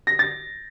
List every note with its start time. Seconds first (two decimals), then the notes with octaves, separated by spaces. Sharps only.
0.07 A#6
0.19 A6